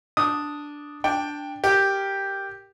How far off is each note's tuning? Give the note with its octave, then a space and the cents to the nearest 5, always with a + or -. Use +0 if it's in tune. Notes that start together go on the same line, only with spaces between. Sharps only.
D4 +0 D#6 +0
D4 +0 G5 +10
G4 +0 A#4 +0